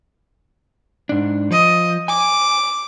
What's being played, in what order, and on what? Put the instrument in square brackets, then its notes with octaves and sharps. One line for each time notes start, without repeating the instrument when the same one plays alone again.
[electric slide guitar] G#2 D4
[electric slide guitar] F3 [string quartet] D#5
[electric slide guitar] G#5 [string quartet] D6